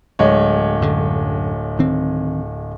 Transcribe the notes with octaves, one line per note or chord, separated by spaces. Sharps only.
D1 G#3 C#5
F#2 D3
D#3 C4